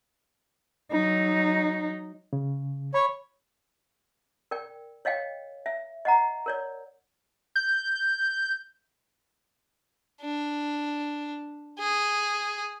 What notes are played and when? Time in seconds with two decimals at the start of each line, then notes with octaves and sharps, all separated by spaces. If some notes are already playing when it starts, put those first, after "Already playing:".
0.92 F#3 D#4
2.33 C#3
2.94 C#5 B5
4.51 A#4 D5 G5
5.05 C#5 D#5 F5 G5
5.66 E5
6.05 D#5 F#5 A#5
6.46 A#4 C#5 D5
7.56 G6
10.21 D4
11.79 G#4